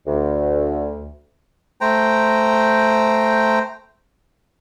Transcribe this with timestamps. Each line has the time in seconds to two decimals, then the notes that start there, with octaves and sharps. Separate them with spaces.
0.06 D2
1.81 A3 C5 G5 A#5